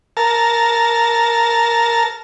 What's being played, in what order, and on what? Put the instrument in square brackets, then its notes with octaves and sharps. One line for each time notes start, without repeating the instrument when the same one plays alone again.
[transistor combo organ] A#4 A5